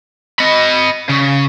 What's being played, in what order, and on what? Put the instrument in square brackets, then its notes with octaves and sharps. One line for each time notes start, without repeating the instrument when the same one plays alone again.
[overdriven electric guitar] D#5 B5
C#3